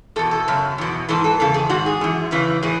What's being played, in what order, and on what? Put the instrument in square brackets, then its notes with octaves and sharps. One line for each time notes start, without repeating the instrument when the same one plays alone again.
[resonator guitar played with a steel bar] E2 A4
B2
A4
F#2 C#3
E2 B2
G#2 E3 A4
A4
E2 C#3 A4
G#4
G#2 D#3 F#4
G#4
F#2 E3
E2 C#3 E3
A2 E3 G#4